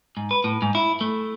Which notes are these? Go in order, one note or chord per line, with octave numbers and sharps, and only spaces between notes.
G#2
B4
A2
G#2
E4
A3